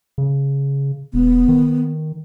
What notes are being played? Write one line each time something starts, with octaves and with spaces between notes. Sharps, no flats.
C#3
E1 B3
D#3